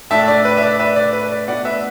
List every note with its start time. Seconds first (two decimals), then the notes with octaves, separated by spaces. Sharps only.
0.10 A2 A3 D4 E5 A5
0.28 D5
0.45 B4
0.57 E5
0.63 D5
0.80 B4 E5
0.96 D5
1.13 B4
1.31 D5
1.47 B2 A3 D4 D5 F#5
1.65 B4 E5